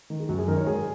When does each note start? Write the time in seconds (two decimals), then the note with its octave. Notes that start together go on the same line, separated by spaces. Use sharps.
0.10 D#3
0.20 G#4
0.29 F#2 F#4
0.39 G#4
0.48 D#3 A#4
0.57 C#5
0.67 G#2 G#4